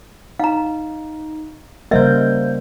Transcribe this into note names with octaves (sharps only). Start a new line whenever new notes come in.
D#4 F5 A#5
C#3 G3 A#3 A#4 C5 D#5 E5 G6